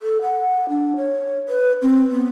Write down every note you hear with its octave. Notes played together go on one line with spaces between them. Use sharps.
A4
F#5
D4
C#5
B4
C4
B3